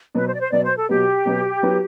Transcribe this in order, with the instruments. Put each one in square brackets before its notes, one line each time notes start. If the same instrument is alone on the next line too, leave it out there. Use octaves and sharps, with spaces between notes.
[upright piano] B2 F#3 B3 [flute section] B4
[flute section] C5
D5
C5
[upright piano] B2 F#3 B3 [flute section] D5
[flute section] C5
A4
[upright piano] B2 F#3 B3 [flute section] G4
[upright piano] B2 F#3 B3
F#3 B3 E4 B4